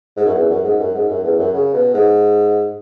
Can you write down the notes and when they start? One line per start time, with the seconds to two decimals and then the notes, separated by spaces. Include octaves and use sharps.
0.17 G#2
0.26 F#2
0.34 E2
0.50 F#2
0.64 G#2
0.80 F#2
0.94 G#2
1.09 F#2
1.23 E2
1.39 F#2
1.53 C#3
1.74 B2
1.94 G#2